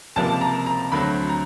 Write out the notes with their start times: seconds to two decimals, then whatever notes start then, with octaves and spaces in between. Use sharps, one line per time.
0.16 C#2 C3 F3 A#3 A5
0.41 A#5
0.66 A#5
0.92 D2 D3 F#3 A3 C4 B5
1.29 A#5